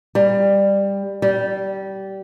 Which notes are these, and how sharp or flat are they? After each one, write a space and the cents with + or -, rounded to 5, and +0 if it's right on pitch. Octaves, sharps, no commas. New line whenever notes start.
G3 +15
G3 -20